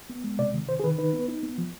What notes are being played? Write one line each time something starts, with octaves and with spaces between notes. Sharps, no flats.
B3
G#3
C3 D5
D#3
C3 C5
G#4
D#3 B4
D#4 B4
B3
D#4
B3
F3